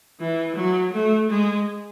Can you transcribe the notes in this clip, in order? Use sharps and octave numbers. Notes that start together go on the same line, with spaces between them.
E3
F#3
A3
G#3